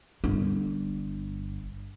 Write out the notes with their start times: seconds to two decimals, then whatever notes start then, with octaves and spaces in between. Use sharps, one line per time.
0.24 G1 D4